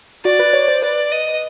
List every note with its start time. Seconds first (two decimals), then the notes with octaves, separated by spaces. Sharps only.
0.25 F#4 D5
0.39 B4
0.53 C#5
0.68 C5
0.82 B4 D5
1.11 D#5